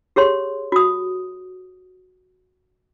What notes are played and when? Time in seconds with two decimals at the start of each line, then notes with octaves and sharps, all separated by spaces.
0.16 G4 G#4 C#5 C6
0.72 F#4 D#6